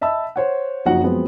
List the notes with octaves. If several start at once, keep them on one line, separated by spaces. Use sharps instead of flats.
D#5 E5 A5 B5 E6
C5 C#5 F#5
F#1 F3 D#4 F#4 F#5
F3 F#3 G#3 B3 C4